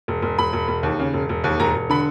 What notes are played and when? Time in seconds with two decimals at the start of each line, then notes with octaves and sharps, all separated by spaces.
0.08 E1
0.22 E1
0.38 E1 B5
0.53 E1
0.68 E1
0.83 D#2
0.99 C#3
1.13 E1
1.29 E1
1.44 D#2
1.60 E1 A#5
1.75 E1
1.90 D3 B5